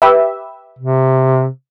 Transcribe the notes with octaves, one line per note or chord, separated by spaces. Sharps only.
G4 B4 E5
C3